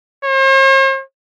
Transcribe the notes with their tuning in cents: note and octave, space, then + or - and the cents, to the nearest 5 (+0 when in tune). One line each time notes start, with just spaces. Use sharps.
C5 +45